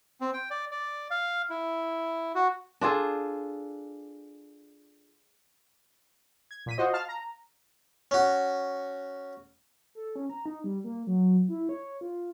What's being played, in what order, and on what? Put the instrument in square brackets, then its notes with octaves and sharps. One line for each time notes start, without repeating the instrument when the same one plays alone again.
[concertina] C4
G5
D5
D5
F5
E4
F#4
[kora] D4 F4 G#4 A4
[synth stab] G#6
A#2 B6 D#7
F4 F#4 C5 D#5
F5 A5 F6
A#5
[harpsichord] C#4 F#4
[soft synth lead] A4
C#4
A#5
D#4
G3
A#3
F#3
E4
C#5
F4